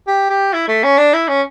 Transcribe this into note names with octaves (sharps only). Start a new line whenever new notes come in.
G4
G4
E4
A3
C#4
D4
E4
C#4